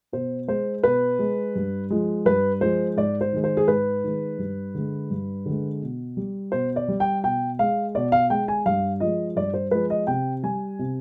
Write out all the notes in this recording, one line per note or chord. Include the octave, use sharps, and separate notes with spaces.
B2 C5
G#3 C5
B2 B4
G#3
G2
F3 G#3
G2 B4
F3 G#3 C5
G#2 D5
C5
D#3 G#3
C5
G#4
G#2 B4
D#3 G#3
G2
D3 G#3
G2
D3 G#3
B2
G3
B2 C5
D5
G3
G5
B2 G5
G#3 F5
B2 D5
F5
G#3 G5
G#5
G2 F5
F3 G#3 D#5
G2 D5
C5
F3 G#3 B4
D#5
C3 G5
G3 G#5
C3